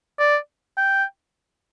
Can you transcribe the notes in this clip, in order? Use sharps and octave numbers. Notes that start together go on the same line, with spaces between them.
D5
G5